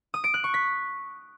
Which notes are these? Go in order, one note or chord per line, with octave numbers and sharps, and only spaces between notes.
D#6
D7
F#6
C#6
B6